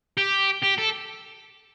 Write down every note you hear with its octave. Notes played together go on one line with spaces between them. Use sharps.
G4
G4
A4